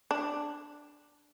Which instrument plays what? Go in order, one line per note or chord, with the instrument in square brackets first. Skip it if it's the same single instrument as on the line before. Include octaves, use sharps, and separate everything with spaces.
[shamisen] D4